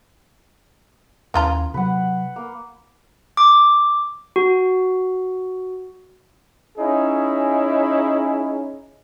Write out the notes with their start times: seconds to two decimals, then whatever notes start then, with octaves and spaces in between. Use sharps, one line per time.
1.34 D#2 E3 C#4 F4 A#5
1.74 C3 F#3 B4 F#5
2.36 A#3
3.37 D6
4.36 F#4
6.78 C#4 D#4 E4 G#4